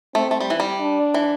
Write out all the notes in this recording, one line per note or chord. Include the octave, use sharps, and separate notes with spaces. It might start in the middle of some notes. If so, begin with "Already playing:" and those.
A3 C4
A3
G3
E3
G3
D4
E3